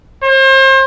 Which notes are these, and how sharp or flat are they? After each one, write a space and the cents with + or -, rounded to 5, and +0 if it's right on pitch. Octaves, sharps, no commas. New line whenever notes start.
C5 +35